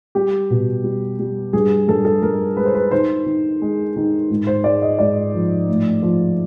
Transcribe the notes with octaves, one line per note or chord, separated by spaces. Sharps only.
G3 G4
B2
G3
G3
G2 G#4
G2 A4
A4
G2 A#4
G#3 B4
C5
B4
D#3 C5
D#3
G#3
D#3
G#2
C5
G#3 D5
D#5
G#2 D5
F3
A2
F3